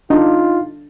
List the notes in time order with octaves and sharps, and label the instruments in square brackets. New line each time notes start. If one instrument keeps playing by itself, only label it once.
[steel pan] D4 [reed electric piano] D#4 [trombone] F4